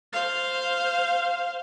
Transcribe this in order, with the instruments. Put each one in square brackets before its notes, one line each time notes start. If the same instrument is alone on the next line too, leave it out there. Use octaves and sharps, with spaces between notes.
[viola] C5 F5